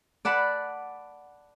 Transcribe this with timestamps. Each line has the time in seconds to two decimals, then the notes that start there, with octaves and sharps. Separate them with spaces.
0.25 D5 F#5 A5 B5